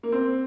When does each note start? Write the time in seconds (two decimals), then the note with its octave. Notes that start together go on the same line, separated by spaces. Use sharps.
0.03 A#3
0.12 C4